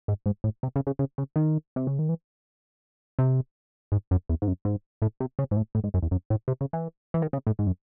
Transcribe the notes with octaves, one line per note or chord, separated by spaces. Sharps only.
G#2
G#2
A2
C3
C#3
C#3
C#3
C#3
D#3
C3
C#3
D#3
E3
C3
G#2
F#2
E2
G#2
F#2
G#2
A2
C3
C#3
G#2
A2
A2
G#2
F#2
E2
F#2
A2
C3
C#3
E3
E3
D#3
C#3
A2
G#2
F#2